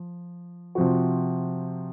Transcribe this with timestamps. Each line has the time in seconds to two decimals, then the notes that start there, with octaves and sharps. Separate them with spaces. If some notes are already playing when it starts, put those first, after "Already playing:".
Already playing: F3
0.75 C3 F3 C4 F#4